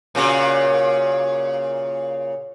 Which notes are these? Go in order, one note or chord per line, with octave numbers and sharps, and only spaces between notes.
A#2 C#3 F#4